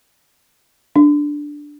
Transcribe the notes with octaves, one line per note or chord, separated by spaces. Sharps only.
D4